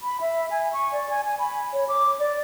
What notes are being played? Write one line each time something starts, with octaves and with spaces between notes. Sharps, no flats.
B5
E5
G#5
C#6
D5
G#5
G#5
B5
C#5
D6
D5